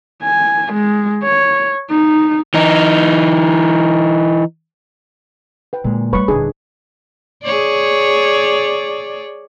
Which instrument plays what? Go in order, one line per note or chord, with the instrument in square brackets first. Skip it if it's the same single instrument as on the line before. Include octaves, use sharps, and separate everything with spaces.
[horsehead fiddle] G#5
G#3
C#5
D#4
[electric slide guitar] E3 D#4
[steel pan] B4 G5
[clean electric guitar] A#2 G#3 [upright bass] D3
[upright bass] G3 A3 [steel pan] B4 C#5 C#6 [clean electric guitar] B5
[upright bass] D#1 E4 [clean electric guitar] D3 D4 [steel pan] G#4
[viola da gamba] G#4 C#5 D5